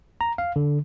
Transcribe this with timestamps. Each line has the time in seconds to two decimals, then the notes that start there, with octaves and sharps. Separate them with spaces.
0.21 A#5
0.38 F5
0.56 D3